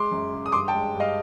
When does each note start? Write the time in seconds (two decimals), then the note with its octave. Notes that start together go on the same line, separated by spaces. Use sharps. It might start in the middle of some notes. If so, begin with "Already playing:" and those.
Already playing: G#3 C6 D6
0.11 F#2
0.32 C#3
0.46 D#6
0.52 G2 C6 D6
0.68 G5 A5
0.74 G#3
0.95 G2
1.00 D#5 F5